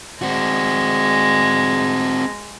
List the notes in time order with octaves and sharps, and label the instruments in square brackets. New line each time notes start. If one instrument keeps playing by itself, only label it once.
[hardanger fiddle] G#3 [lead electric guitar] C4 F#4